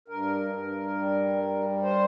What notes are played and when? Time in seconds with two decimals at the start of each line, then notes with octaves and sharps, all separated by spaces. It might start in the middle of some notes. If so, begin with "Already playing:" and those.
0.08 G2 A#4
0.53 G2
0.95 G3
1.40 G3
1.82 C5